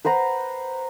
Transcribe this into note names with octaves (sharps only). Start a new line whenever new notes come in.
B4 C5 F#5 A#5